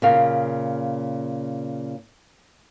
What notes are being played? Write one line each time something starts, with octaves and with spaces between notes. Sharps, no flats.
A#2 C#3 F5